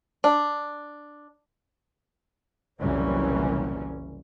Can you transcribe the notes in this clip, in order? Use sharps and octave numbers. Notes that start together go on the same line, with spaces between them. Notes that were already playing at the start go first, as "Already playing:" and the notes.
D4
F#1 C2 A#2 E3 C#4